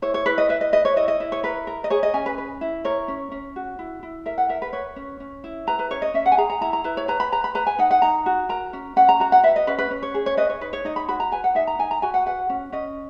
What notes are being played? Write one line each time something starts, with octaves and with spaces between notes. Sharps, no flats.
E4 C#5
C#5
E4 B4
D#5
B4 E5
D#5
B4 D#5
C#5
E4 D#5
D#5
E4
C#5
A#4 B4
A#4
D#5
G#4 C#5
D#5
C#4 G#5
B4
B4
E4
A#4 C#5
C#4
C#4
F#4
E4
E4
A#4 E5
F#5
A#4 E5
B4
B4 C#5
C#4
C#4
E4
B4 A#5
B4
C#4 C#5
D#5
C#4 E5
F#5
G#5
G#4 A#5
A#5
E4 A#5
A#5
E4 B4
C#5
B4 A#5
B5
B4 A#5
B5
B4 A#5
G#5
D#4 F#5
F#5
D#4 A#5
F#4
A#4 A#5
C#4
C#4 F#5
A#5
F#4 A#5
F#5
B4 E5
D#5
C#4 B4
B4
C#4
C#5
G#4
C#5
B4 D#5
C#5
D#4 B4
C#5
D#4 D#5
B5
F#4 B5
A#5
B4 G#5
F#5
D#4 E5
A#5
D#4 G#5
A#5
F#4 G#5
F#5
B4 F#5
C#4
C#4 D#5